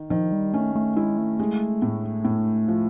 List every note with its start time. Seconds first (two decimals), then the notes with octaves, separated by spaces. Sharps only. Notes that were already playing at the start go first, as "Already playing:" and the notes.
Already playing: D#3
0.10 D#3 F3
0.32 G3
0.54 A3 C#4
0.76 A3
0.96 G#3 E4
1.18 A3
1.39 G#3
1.82 A2
2.25 A2
2.68 F3